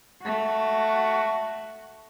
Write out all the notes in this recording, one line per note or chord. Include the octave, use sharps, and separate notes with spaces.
A3 F#4